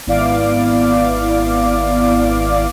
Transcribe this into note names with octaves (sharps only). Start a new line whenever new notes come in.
G#1 B3 E4 D5 F5 D6